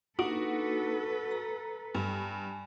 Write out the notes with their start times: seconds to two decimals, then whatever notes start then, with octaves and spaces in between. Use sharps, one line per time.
0.19 A#3 D4 D#4 F#4 A4 B4
1.31 A#5
1.95 G2 G#5